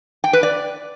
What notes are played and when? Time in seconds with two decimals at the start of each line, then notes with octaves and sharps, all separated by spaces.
0.24 G5
0.33 B4
0.43 D5